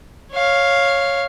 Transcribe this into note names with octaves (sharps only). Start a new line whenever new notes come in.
C#5 F5